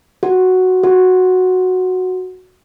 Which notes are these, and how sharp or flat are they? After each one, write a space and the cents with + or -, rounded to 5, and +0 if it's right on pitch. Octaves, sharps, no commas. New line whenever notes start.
F#4 +0
F#4 -5